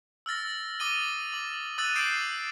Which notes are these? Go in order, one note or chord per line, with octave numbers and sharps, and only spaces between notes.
E6 F6 A6 A#6
D6 D#6 A6 D#7 G7
D6 F#7
D#6 E6 F#6 A6 D#7 F#7
D6 G6 A6 C7 D7 E7